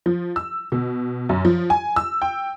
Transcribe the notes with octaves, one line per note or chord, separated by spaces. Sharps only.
F3
E6
B2
F#2
F3
G#5
E6
G5